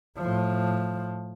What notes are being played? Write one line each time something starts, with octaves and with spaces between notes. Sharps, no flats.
A2 F3